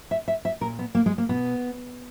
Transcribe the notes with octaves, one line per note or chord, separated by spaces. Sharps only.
E5
E5
E5
A#2 A#4
B3
A#3
G#3
A#3
B2 B3